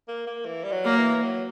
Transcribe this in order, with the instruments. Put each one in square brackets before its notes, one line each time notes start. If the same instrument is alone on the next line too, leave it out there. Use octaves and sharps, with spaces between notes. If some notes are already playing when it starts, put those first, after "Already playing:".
[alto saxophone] A#3
A#3
E3
G3
F#3
[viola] A#3
[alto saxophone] E3
F#3